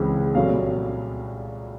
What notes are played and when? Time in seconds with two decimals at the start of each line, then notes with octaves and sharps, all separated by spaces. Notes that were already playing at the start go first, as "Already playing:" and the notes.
Already playing: C#2 C#3 E3 G#3 C4
0.35 C2 A#2 F#3 A3 C#4 F5